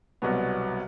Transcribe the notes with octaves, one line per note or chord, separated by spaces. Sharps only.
C2 B2 F#3 B3